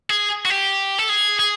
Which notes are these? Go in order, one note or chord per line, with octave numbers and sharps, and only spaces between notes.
G#4
F#4
G4
A4
G#4
G#4